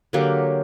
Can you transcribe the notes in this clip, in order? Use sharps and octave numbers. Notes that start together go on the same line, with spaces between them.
D3 F#3 A#3 G4